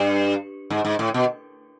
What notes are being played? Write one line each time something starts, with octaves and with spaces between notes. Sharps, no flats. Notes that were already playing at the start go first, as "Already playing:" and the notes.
Already playing: G2
G#2
G#2
A2
B2